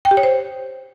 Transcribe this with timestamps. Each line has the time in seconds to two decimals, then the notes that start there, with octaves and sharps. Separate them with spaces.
0.05 G5
0.11 G4
0.17 C#5
0.23 C5